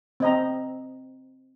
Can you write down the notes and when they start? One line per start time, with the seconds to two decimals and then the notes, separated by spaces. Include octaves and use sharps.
0.20 C4 D#5 A#5